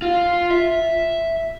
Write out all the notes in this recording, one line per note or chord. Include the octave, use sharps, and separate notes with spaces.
F4
E5